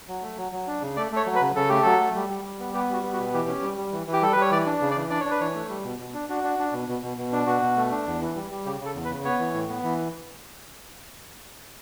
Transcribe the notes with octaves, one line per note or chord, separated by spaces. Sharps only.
F#3
A3
F#3
F#3
D4
C#3
A3 D5
A3 C#5
F#3
B4
C#3
C#3 A4
A3 G4
F#3 A4
A3
G3
G3
G3
B3
B3 G4
G3 F#4
B3
F#4
B2
E3 G4
C#4
G3
G3
E3
E3
G4
G3 A4
G3 B4
C#5
E3 D5
D4
C#3
D5
E3
D4 D5
D4 C#5
B4
E3 C#5
A3
G3
B2
B2
D4
D4 F#4
D4
D4
B2
B2
B2
B2
D4
B2 F#4
B2
A3
D4
E2
E3
G3
G3
C#3 G4
C#3 A4
E2
B4
C#3
B3 C#5
E3
A2
B3
E3